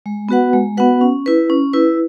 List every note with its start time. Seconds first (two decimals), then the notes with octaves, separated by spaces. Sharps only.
0.06 G#3
0.29 B3 F#4 B4 F#5
0.53 G#3
0.77 B3 F#4 B4 F#5
1.01 C#4
1.26 E4 B4
1.50 C#4
1.73 E4 B4